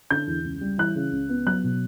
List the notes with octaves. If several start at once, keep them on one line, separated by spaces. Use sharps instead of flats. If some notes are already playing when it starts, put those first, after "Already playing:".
D3 G6
E2
C#2
G3
E3 F#6
C#3
C#2
B3
F#3 F#6
B2